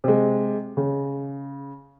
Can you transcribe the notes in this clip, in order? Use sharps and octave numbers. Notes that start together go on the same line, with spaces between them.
C3 G#3
C#3